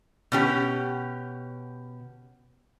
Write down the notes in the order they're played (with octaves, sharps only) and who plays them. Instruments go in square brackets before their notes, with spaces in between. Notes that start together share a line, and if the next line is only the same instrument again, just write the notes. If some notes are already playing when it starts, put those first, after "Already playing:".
[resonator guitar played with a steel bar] B2 C#4 G4